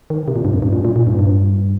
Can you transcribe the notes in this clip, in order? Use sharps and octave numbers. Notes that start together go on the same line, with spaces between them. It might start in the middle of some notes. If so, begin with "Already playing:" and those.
D#3
C3
A#2
G2
F2
G2
A#2
A#2
A#2
G2
G2